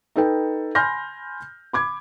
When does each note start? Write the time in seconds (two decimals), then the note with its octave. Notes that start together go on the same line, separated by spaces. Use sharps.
0.16 D#4 A4 B4 G5
0.75 G#5 B5 C6 F6 G6 A#6
1.73 B5 D6 G#6